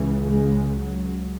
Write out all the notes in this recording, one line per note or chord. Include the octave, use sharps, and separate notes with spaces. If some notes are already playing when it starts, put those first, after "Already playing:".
Already playing: C#2 C#3 E3
G#3
F#3